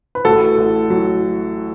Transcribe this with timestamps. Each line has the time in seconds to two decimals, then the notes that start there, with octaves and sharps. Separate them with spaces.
0.15 B4
0.24 A1 F#4 A4
0.58 A1
0.90 F#3